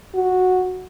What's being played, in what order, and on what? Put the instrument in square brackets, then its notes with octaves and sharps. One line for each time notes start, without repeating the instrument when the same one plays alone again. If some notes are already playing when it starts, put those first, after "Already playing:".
[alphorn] F#4